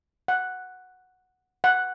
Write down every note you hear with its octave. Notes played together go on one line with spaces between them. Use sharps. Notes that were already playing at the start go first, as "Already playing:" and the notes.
F#5
F#5